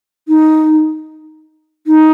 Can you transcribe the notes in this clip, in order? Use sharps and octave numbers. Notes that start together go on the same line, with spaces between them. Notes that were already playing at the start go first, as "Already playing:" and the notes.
D#4
D#4